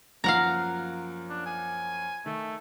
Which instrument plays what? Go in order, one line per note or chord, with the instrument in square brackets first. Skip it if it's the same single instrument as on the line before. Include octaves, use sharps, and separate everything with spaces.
[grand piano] F#2 F3 A#3 [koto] F5 F#5 A#5
[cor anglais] D4
G#5
[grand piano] D#3 [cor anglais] A3